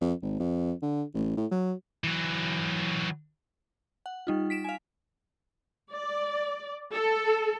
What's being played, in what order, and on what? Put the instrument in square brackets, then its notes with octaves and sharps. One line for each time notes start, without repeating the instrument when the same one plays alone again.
[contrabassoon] F2
G#1
F2
D3
A1
A2
F#3
[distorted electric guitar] E3 F#3
[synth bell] F#5
G3 D#4 F4
B6 D7 E7
F5 G#5
[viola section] D5
A4